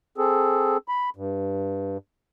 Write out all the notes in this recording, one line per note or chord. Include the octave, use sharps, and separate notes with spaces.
C4 G#4 A4
B5
G2